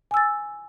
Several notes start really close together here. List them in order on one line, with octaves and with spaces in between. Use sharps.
G#5 E6 A6